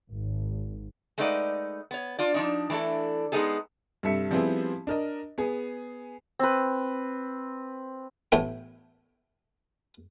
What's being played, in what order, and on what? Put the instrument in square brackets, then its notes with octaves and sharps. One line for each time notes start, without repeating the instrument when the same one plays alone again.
[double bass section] G#1
[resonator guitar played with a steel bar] G#3 A3 D#4 B4 D5 F#5
B3 C#5
D4 F4 D5
F3 D4 D#4
E3 A3 D4 E4 A4
G#3 B3 D#4 G#4 A4
[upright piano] G2 C3 A4 E5 C#7
F3 G3 B3 C4 E4 G#4
D4 A#4 D#5
B3 G#4
[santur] C4 B4
[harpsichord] A1 A2 A3 B3 G5